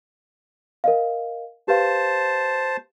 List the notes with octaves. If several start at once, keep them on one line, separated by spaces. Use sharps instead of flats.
A#4 D#5 F5
G4 B4 C5 F5 A5